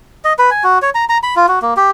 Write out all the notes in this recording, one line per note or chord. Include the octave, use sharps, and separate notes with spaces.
D#5
B4
G#5
F#4
C#5
A#5
A#5
B5
F4
F#4
A#3
G4